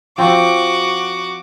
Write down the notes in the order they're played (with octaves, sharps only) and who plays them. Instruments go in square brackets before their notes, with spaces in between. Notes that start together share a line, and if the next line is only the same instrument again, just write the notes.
[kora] F3 C4 [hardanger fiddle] F#4 D6